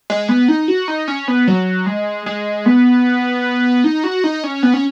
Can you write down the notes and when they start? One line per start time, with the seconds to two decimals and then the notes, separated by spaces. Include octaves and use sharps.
0.10 G#3
0.29 B3
0.48 D#4
0.68 F#4
0.88 D#4
1.08 C#4
1.28 B3
1.48 F#3
1.86 G#3
2.26 G#3
2.66 B3
3.84 D#4
4.04 F#4
4.24 D#4
4.44 C#4
4.63 B3
4.74 C#4